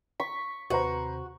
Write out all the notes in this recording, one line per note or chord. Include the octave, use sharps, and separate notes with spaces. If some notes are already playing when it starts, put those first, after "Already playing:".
C#6 B6
D#2 C3 F#4 B4 C5 A#5